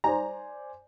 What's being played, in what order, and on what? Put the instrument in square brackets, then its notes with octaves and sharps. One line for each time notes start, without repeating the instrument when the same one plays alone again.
[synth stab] G3 D#4 A#5 [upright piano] C5 D5 G#5